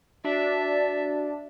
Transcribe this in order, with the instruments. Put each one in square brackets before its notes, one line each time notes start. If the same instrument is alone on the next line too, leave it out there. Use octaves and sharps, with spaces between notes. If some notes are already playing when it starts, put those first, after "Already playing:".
[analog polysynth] D4 [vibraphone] F#4 [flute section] D5 [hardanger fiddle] E5